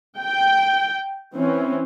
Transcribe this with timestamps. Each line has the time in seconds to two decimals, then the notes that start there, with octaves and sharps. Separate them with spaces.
0.19 G5
1.34 E3 C4 C#4